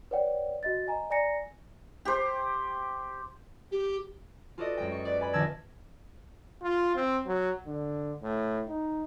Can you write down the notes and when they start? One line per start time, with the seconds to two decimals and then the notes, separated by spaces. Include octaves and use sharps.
0.11 B4 C#5 D5 F#5 G5
0.63 F#4 D#5 A6
0.87 D#5 G#5 A#5
1.10 D5 G#5 A#5 A#6 C#7
2.05 G4 C5
3.71 G4
4.58 F4 F#4 A4 B4 D5 D#5
4.77 F#2 G#3 G5
4.92 C#6
5.05 B4 D5
5.20 D5 G#5 B5
5.33 A#1 D#3 A5 E6 G#6 A#6
6.63 F4
6.95 C4
7.26 F#3
7.66 D3
8.23 A2
8.68 D#4